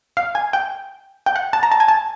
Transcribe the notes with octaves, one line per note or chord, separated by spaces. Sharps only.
F5
G#5
G5
G5
F#5
A5
A#5
A5
G#5
A5